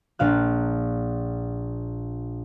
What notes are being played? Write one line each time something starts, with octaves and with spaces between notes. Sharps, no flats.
A#1 A#2 F5 F#6